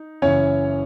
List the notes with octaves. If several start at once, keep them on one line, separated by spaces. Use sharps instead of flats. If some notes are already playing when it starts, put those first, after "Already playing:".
Already playing: D#4
F#1 F#2 E3 C#4 C#5